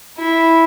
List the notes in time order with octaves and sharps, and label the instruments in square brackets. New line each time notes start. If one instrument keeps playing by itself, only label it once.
[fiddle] E4